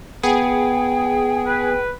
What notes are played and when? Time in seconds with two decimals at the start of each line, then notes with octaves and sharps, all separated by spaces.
0.23 B3 G#4 G5
1.46 B4